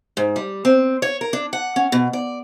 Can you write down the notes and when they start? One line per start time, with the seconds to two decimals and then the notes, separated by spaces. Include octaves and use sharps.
0.17 G#2
0.36 G3
0.65 C4
1.02 C#5
1.21 A#4
1.33 D4
1.53 F#5
1.76 C#4
1.92 B2
2.13 D5